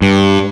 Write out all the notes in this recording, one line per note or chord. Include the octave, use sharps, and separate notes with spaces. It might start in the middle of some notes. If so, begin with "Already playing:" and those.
G2